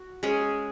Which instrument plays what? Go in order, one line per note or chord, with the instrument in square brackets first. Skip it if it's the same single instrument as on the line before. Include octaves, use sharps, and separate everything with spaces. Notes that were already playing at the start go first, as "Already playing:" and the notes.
Already playing: [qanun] F#4
G#3 C#4 G#4